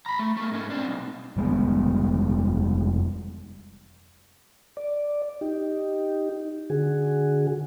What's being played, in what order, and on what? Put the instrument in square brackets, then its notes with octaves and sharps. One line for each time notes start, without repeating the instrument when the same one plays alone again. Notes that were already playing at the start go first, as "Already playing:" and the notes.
[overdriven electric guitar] A#5 B5
A3
A3 A#3
G#2 C#4
C4 D4
B1
[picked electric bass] F1 G3 G#3 B3
[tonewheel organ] D5
D#4 G4
D3 F#4 G#4